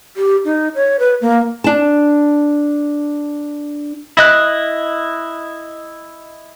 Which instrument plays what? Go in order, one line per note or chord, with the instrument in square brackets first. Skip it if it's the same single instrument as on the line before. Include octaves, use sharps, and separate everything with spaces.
[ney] G4
D#4
C#5
B4
A#3
[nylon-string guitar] D4 A5
[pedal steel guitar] E4 D#5 F#6